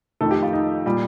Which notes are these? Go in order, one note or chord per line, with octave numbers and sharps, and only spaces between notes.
F2 D#3 A3 A4
G4
F4
D#4
A#2 G3